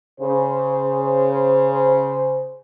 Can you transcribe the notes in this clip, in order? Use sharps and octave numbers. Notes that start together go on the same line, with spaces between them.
C#3 C5